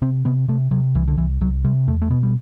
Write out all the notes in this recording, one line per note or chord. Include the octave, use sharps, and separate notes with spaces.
C3 C4
C3 B3
C3 A3
C3 F#3
C2 E3
D3
C2 E3
C2 F#3
C3 G3
E2 A3
A3
B2 B3
G3